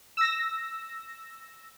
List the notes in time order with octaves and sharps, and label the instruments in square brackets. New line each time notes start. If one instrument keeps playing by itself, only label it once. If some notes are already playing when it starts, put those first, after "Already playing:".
[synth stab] E6 A#6